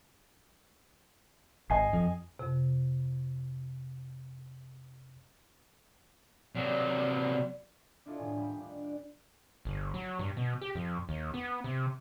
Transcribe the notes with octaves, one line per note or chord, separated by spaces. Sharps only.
G#1 D#5 G#5 C7
F2
F2 C3
C3 F#3 D5
D4 E4 F4 A4 D#5
D#1 A2 G#5
G3
D4
D5 F#6
G1
F#3
G2
B2
G4
F2
D#2
B3
C3